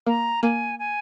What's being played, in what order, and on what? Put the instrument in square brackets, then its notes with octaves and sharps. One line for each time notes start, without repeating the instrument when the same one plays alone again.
[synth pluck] A#3 [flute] A#5
[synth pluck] A#3 [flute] G#5
[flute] G#5